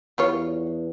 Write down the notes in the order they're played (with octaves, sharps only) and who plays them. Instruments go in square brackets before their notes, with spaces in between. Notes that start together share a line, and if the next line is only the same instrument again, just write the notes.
[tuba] E2 [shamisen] G3 F4 C#5